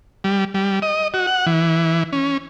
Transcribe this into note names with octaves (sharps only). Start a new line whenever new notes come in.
G3
G3
D#5
F#4
F#5
E3
C#4